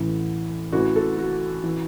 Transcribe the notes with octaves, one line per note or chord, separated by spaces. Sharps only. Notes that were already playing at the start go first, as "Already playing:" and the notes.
Already playing: A1 A2 E3
A1 A2 E3 F#4
A4
F#4
E3